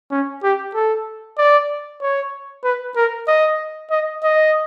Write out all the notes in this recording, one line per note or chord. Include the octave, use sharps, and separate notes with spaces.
C#4
G4
A4
D5
C#5
B4
A#4
D#5
D#5
D#5